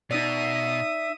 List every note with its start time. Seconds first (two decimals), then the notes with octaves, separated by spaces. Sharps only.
0.11 B2 D#4 D5 E5 D#6